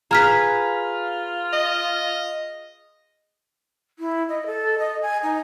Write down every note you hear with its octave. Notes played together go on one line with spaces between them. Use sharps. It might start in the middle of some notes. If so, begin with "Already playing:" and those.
F4 G#4 B4 A#5 F6 B6
D#5
E4
D#5
A4
D#5
G#5
D#4